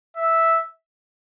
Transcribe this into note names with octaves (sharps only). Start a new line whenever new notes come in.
E5